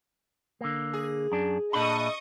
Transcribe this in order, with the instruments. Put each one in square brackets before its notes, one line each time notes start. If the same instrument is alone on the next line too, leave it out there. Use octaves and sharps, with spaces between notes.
[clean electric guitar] D3 A#3
[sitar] G#4
[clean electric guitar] F#2 D4
[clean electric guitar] A#2 B5 [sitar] A3 D4 [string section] D#5 C#6 D#6